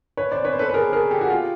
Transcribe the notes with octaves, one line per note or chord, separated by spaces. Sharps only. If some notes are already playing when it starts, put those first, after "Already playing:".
B4 C#5
C5 D5
B4 C#5
C5
A4 B4
B4
G#4 A#4
G#4 A#4
G4 A4
F#4
F4 G4